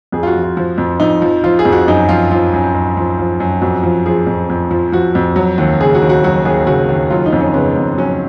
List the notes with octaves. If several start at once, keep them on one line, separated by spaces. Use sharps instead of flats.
F2 G#4
F4
F#4
F3
F4
F3
F2
F2 D#4
F3
F3 F4
G#4
F2
F#4
F#2 D#4
F3 F4
F3 F4
F#2
F#2
F3
F3
F#2
F2 F#4
F3
F3 G#4
F2
F2
F3
F3 F#4
F2
F#3
D#2
C#3 G#4
F#4
D#2
F#4
F#3 F#4
D#2 G#4
C#3 F#4
D#2
F#3 F4
D#4
F2
C#4
C#3 B3
F2
F#3 C#4